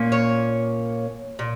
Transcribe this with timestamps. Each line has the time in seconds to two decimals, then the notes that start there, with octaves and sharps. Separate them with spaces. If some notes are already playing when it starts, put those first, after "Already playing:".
Already playing: A#2 A#3 C#4
0.12 C#5
1.39 A#2